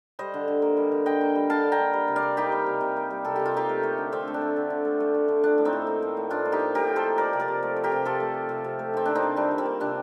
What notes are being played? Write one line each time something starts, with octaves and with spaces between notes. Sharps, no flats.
G3 C5 D#5
D3
D3
A#3
G3
D3
D3 D#5 G5
A#3
G3
D3 F5 A5
D3
G5 A#5
A#3
G3
C3
D5 F5
C3
A#3 D#4 G4
G3
C3
C3
A#3
G3
C3 A4
C3 G4
F4
A#3 D#4 G4
A3
A3
D3
D3 C4
A3
D4
A3
D3
D3
A3
A3
D3
D3
F3 D4
A2
C4 D#4
A2
A#3
F3
A2
A2 D4 F4
A#3
D#4 G4
F3
A2 G4 A#4
A2
A4 C5
A#3
F3 A#4 D5
C3
A#4 D5
C3
A3
F3
G4 A#4
C3
C3 F4 A4
A3
F3
C3
C3
A3
D#3 C4
A#3 D4
C4 D#4
C3
G3 D4
D#3
C4
A#3
C3 D4